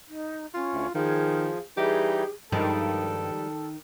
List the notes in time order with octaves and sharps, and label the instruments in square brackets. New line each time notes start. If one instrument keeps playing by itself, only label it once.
[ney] D#4
[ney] C#4 [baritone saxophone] F4
[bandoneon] D2
[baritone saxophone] D#3 [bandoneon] F3 [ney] G#4
[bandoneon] E3 G3 D#4 [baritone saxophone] G4 [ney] G#4
[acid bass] G2 [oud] D#3 [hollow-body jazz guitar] F3 G3 G#3 [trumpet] A4